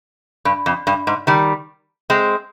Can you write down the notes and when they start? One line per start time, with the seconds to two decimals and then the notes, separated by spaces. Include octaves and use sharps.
0.45 G2
0.66 F2
0.87 G2
1.07 G#2
1.27 D#3 G3
2.10 G#3 C4